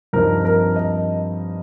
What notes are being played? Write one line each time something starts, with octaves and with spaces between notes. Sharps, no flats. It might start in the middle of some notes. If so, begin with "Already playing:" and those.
G2 F3 C4 D#4 A#4
A#4
D#5